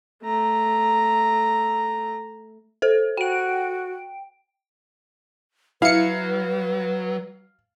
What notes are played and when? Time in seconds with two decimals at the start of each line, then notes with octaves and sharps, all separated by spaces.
0.23 A3 A#5
2.82 A4 C5
3.17 F#4 G5 D7
5.82 F#3 E4 B4 F5 C#7